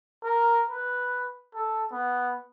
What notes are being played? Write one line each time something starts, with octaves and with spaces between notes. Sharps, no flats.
A#4
B4
A4
B3